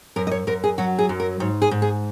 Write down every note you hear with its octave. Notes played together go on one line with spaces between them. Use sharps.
F#2 A#4
D#5
C#5
F#2 A#4
G#4
F#3 F#4
G#4
F#2
A#4
G#2 C#5
G#4
G#2
G#4